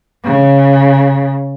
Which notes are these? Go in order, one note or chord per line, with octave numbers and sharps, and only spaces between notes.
C#3